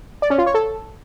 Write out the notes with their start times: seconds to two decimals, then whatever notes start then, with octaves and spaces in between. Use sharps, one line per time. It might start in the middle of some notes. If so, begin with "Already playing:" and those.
0.22 D5
0.30 C#4
0.38 F4
0.46 C#5
0.54 A4